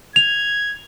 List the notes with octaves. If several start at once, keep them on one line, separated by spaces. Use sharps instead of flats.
G#6 F7